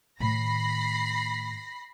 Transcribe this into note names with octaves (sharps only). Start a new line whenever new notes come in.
A2 D#3 B5 A#6 C7